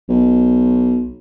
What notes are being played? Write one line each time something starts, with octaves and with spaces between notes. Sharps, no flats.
B1